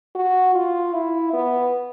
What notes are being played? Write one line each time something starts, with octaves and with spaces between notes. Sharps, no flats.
F#4
F4
E4
B3